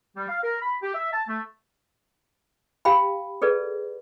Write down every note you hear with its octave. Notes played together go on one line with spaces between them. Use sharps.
G3
F5
A#4
B5
G4
E5
A5
A3
G4 F5 G5 B5
G#4 A4 B4 D5